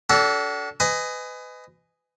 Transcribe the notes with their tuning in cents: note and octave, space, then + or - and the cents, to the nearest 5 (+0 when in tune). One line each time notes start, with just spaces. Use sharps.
D4 -30 F#4 +40 A4 +0
B4 +30 D#5 +0 G#5 +0